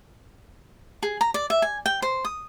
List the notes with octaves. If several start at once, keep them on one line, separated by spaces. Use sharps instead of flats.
G#4
A#5
D5
E5
G#5
G5
C5
D#6